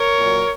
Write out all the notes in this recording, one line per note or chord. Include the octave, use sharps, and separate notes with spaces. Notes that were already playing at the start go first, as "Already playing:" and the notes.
Already playing: A#4 C#5
A#2 F#3